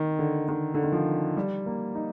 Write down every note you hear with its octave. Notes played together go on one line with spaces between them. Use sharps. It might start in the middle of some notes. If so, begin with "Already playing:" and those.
Already playing: D#3
D3
D#3
D3
D#3
F3
G3
A#3
D#4